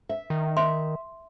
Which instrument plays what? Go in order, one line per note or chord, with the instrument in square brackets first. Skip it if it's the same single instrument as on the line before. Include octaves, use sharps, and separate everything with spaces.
[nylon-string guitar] E5
[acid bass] D#3
[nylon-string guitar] E5 [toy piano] C6